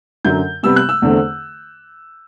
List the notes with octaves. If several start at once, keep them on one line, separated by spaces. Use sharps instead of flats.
F#2 D3 F#3 G6
C3 G3 B3 E6
F#6
E6
E2 D3 A3 C4